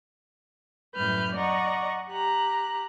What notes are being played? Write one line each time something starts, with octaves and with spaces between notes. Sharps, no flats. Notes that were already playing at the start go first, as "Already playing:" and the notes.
F#2 A2 G3 B4 F6 G6
D5 D#5 F#5 A#5 C#6
G4 A#5 F#6